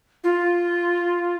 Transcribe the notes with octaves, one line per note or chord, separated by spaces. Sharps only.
F4